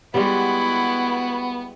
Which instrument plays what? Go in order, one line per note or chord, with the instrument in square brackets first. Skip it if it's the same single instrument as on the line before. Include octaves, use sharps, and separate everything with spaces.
[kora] G3 G#3 [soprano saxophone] B3 [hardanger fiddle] E4 F#4